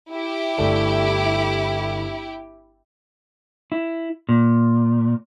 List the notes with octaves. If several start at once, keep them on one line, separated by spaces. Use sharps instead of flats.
E4 G4
G1 A3 D5
E4
A#2